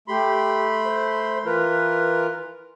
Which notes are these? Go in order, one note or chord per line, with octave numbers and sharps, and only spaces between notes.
A3 G4 B5 C6
C5
E3 F4 A#4 B4